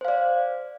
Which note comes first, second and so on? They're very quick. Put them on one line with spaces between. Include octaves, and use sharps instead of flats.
C5 F5 D5